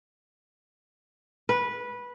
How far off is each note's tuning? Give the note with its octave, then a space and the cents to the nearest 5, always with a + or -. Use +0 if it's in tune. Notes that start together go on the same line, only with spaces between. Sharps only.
B4 -15